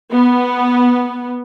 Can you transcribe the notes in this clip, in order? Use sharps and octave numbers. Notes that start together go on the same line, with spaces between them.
B3